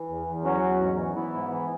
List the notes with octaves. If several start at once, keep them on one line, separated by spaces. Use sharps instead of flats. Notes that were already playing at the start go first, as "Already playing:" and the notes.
Already playing: E3
E2
E2
F#3 C#4 F#4
E2
G#2
E3
E3 B3 E4
G#2
E3